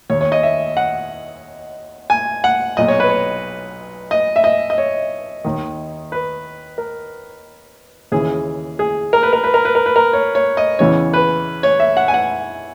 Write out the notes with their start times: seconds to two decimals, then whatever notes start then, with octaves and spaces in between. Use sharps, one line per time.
0.10 D#2 D#3 C#5
0.21 C#5
0.32 D#5
0.43 E5
0.77 F#5
2.10 G#5
2.44 F#5
2.77 B1 A#2 D#5
2.88 C#5
3.00 B4
3.10 C#5
4.11 D#5
4.36 E5
4.44 D#5
4.70 D#5
4.78 C#5
5.44 D#2 D#3
6.12 B4
6.78 A#4
8.12 D#2 C#3 E3 G#4
8.79 G#4
9.13 A#4
9.23 B4
9.33 A#4
9.44 B4
9.54 A#4
9.65 B4
9.75 A#4
9.86 B4
9.96 A#4
10.13 C#5
10.35 C#5
10.57 D#5
10.79 E2 C#3 E3 C#5
11.13 B4
11.63 C#5
11.80 E5
11.97 F#5
12.08 G#5
12.14 F#5